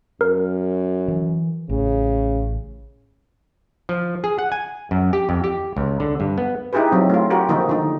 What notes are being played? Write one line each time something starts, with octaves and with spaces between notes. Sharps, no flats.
F#2 A#4
E3
A1 C#3
F3
G#4
F#5
G#5
F#2
G4
F2
G4
C#2
D3
G2
B3
D#4 E4 G4 G#4 B4
F#3 C4
A3 F4
F#4 G4 A#4
D3 D#3 F3 A#3 D#4
D3 D#4